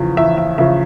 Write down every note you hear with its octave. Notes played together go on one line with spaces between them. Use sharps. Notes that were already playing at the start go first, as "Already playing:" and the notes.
Already playing: E2 C#3 F3
E2 E5
E5
C#3 F3 E5